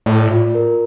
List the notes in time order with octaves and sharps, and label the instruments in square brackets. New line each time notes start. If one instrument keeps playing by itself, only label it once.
[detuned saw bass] A2 [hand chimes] D5
[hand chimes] F4
A#4